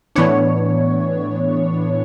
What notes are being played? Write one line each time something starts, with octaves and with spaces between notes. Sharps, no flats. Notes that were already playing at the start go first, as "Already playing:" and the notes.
A2 E3 B3 D4 C#5